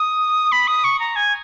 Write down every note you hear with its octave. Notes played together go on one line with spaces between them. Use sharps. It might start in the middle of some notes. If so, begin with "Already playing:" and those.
Already playing: D#6
B5
D#6
C#6
A#5
G#5